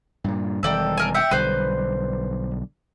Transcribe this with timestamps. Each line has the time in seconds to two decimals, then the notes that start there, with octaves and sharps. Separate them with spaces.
0.24 G2 A#2
0.63 E1 D#3 G3 A4 D5 G5
0.98 A4 A#4 G#5
1.14 E5 F#5 G5
1.31 B1 D3 G3 B4 C5